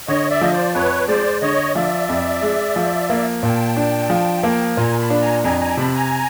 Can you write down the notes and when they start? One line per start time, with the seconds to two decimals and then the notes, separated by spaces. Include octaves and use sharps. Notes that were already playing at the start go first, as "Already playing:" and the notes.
0.08 D3 C#5 D#5
0.30 D5 E5
0.41 F3 D#5
0.52 C5 D5
0.75 F2 B4 C#5
1.08 G#3 C5 D5
1.42 D3 C#5 D#5
1.75 F3 D5 E5
2.09 F2
2.42 G#3
2.76 F3
3.10 A#3
3.43 A#2 G5 A5
3.77 D4
4.10 F3
4.43 A#3
4.77 A#2 G#5 A#5
4.99 A5 B5
5.10 D4
5.21 G#5 A#5
5.44 F2 G#5 A#5
5.61 G#5 A#5
5.77 C3 A5 B5
5.95 G#5 A#5